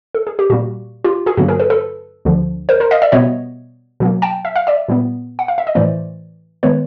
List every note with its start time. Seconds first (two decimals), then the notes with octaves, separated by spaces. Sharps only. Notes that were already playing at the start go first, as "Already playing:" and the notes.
0.15 A4
0.27 G#4
0.39 G4
0.50 A#2 G3 A#3 F#4
1.04 F4 G4
1.26 F#4 G#4
1.37 G2 D3 F#3 A#3 F#4 G#4
1.48 G#4 A#4
1.60 A4 B4
1.70 A4 B4
2.25 D2 D3 F3
2.69 A#4 C5
2.80 A#4 C5
2.91 D#5 F5
3.02 D5 E5
3.12 B2 G3 B3 C#5 D#5
4.00 B2 F#3 A#3
4.22 G5 A5
4.45 E5
4.56 F5
4.67 D5 E5
4.88 A#2 G3 B3
5.39 F#5
5.48 F5
5.58 E5
5.67 D#5
5.75 A2 E3 A3 C5 D5
6.63 D#3 G#3 B3 B4 C#5